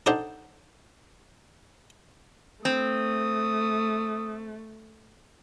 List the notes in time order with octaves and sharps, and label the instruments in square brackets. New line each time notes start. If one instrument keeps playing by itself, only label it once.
[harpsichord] D4 D#4 A4 C5 F#5 G5
[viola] A3 [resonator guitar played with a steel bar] C4 [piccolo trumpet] D#6